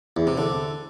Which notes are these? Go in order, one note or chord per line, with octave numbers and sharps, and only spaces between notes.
E2
C3
D3